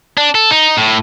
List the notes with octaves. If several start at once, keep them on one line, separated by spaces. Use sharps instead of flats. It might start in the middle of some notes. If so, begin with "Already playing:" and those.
D4
A4
D#4
A2